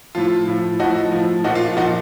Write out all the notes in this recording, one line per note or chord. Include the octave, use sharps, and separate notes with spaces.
A2 F3 F4
A2 F3
A2 F3 D#4 F#4
A2 F3
A#2 F3 D#4 F#4
F4
F4
A#2 F3 D#4 F#4